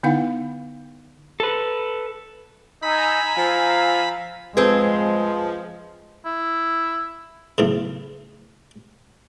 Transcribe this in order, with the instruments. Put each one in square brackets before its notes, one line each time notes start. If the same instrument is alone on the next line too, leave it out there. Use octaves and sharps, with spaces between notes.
[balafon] D3 B3 D#4 E4 F5 F#5
[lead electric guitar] A4 B4
[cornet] D#4 [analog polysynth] G#5 A#5 E6 [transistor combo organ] B5
[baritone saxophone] F3 [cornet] F5
[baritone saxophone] F3 [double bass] G#3 [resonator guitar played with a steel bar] C4 G#4 [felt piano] B4
[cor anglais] E4
[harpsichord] B1 A2 C#3